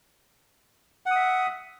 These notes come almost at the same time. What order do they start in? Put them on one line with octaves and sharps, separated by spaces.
F#5 D#6 E5